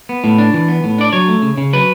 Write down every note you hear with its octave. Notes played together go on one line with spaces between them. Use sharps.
B3
A2
D4
E3
B3
A2
D4 D5
F#3 C#5
A3
C#3
C#3
F#3 B4